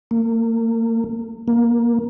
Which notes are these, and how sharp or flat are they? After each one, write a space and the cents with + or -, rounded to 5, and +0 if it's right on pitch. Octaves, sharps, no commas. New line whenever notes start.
A#3 -35
A#3 +15